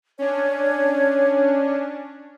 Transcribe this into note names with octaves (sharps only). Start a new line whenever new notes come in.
C#4 D4 C#5